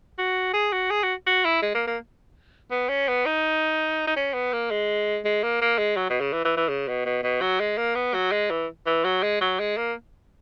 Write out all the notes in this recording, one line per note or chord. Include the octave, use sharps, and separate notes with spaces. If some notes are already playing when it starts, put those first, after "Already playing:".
F#4
G#4
F#4
G#4
F#4
F#4
E4
G#3
A#3
A#3
B3
C#4
B3
D#4
D#4
C#4
B3
A#3
G#3
G#3
A#3
A#3
G#3
F#3
B2
C#3
E3
E3
E3
C#3
B2
B2
B2
F#3
G#3
A#3
B3
F#3
G#3
E3
E3
F#3
G#3
F#3
G#3
A#3